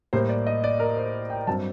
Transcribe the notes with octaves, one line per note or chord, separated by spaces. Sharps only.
A2 G3 A#3 C5
D5
D#5
D5
A#4
C5
G5
G2 F#3 C4 A5